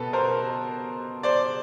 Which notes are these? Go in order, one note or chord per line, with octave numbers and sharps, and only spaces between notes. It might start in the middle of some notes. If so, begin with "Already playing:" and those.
Already playing: B2 A4 B4
A#4 C5
C5 D5